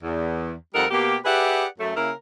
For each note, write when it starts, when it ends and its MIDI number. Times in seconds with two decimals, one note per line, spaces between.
0.02 0.53 40
0.74 0.85 41
0.74 0.85 55
0.74 0.85 63
0.74 0.85 69
0.74 0.85 70
0.74 0.85 78
0.91 1.16 47
0.91 1.16 58
0.91 1.16 67
1.25 1.65 67
1.25 1.65 68
1.25 1.65 71
1.25 1.65 74
1.25 1.65 76
1.25 1.65 78
1.79 1.93 42
1.79 1.93 57
1.96 2.11 49
1.96 2.11 58
1.96 2.11 64
1.96 2.11 70